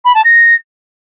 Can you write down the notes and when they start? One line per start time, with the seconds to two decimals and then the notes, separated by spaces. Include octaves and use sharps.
0.05 B5
0.14 A5
0.24 A#6